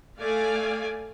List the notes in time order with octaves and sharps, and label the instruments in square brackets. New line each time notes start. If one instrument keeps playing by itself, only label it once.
[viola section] A3 D5 F5 G#5